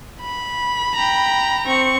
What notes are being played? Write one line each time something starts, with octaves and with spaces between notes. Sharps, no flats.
B5
G5 A#5
C4 C#6